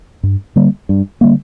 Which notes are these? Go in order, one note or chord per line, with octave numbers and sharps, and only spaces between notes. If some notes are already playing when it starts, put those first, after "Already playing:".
G2
D3 G3 A#3
G2
D3 G3 A#3